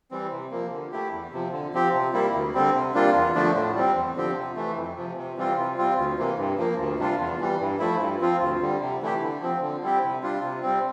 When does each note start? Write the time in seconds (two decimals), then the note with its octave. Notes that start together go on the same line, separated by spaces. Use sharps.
0.11 E3 G3 C4
0.31 C3
0.51 F3 A#3
0.72 D3
0.92 A3 E4 G4
1.12 E2
1.32 C3 F3
1.52 D3
1.74 F3 C4 G4
1.93 C3
2.13 G3 A#3 E4
2.34 D2
2.54 D3 G3 C4
2.74 C3
2.94 G3 A#3 D4 F4
3.15 E2
3.34 D3 F3 A3 D4
3.54 A2
3.75 G3 C4
3.96 E2
4.16 D3 F3 C4 G4
4.36 C3
4.56 E3 A3
4.77 F2
4.97 C3 F3
5.17 C3
5.37 E3 G3 C4 F4
5.57 C3
5.78 G3 C4 F4
5.98 D2
6.18 C3 E3 A#3
6.38 G2
6.58 F3 A#3
6.79 D2
6.99 C3 G3 D4 F4
7.19 E2
7.40 E3 G3
7.60 G2
7.79 F3 A3 E4
8.00 G2
8.21 F3 C4 F4
8.41 D2
8.61 D3 G3
8.80 C3
9.02 E3 A3 E4 G4
9.22 D3
9.42 F3 C4
9.61 D3
9.82 G3 C4 E4 G4
10.03 C3
10.23 G3 D4 F4
10.43 C3
10.63 G3 C4